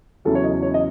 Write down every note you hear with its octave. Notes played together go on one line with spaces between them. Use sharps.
E2 C#3 F#3 C#4 E4 A4
C#5
D#5
C#5
D#5